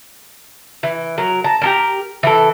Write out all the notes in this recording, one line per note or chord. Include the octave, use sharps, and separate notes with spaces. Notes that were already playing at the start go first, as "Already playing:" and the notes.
E3
F#3 A#4
A5 A#5
G4 A4 A#4
E3 A4